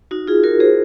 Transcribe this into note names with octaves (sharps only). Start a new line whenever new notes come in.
D#4 F#4
F4 G#4
F#4 A#4
G#4 C5